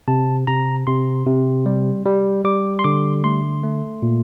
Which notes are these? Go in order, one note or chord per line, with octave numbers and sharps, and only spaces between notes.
C3 A5
C3 A#5
C3 C6
C3
G3
G3
G3 D6
C6
D3 D6
A3 C6
A3
A#2